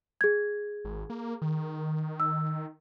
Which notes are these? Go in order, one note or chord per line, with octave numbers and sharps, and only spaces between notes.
G#4 G#6
G#1
A#3
D#3
E6